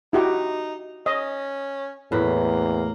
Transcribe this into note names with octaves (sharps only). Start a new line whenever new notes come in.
D#4 E4 F#4 G4
C#4 D#5
E2 A2 A#3 B4